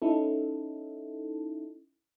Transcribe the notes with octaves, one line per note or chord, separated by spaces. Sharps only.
C#4 D#4 E4 A4